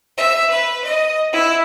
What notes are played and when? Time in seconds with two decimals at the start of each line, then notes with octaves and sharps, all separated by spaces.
0.17 E5
0.50 B4
0.84 D#5
1.33 E4